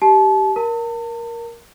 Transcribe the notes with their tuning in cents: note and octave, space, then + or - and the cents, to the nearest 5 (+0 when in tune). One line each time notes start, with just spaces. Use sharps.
G4 -15 A5 -30
A#4 +10 A5 +40